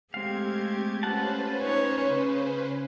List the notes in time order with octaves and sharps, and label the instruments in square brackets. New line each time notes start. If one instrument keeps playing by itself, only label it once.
[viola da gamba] G#3 A3 G4 [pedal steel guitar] C4 F5 [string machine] G#6
[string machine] C#4 B4 C5 [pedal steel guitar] F4 F#5 A5
[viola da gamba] D#4 C#5
C#3